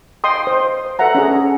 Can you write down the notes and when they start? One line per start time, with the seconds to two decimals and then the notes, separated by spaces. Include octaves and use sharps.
0.24 D#5 G5 C6 D#6
0.47 C5
0.99 A4 B4 E5 F#5 A#5
1.15 C#4 D4 G#4